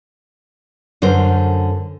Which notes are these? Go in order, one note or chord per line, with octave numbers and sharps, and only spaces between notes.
F#2 D3 A#4 C5